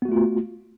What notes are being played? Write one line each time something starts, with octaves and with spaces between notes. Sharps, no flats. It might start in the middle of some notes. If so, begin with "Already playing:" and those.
A3 B3 F4 F#4